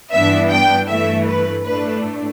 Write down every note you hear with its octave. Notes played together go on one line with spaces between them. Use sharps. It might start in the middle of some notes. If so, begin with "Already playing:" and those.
G2 E3 B3 D4 E5
G5
G2 E3 A3 E5
B4
A2 A3 D4 B4